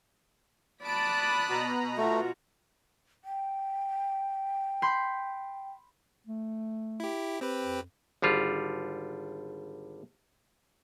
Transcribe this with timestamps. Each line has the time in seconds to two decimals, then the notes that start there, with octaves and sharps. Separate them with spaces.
0.84 D5 A5 B5 D#6 F#6 D7
1.49 B2 A#5
1.97 A3 F4 F#4
3.24 G5
4.82 B5 C6 G6
6.27 A3
7.00 E4 G4
7.41 C4 G4 B4
7.61 F2
8.22 G#1 D3 G3 F4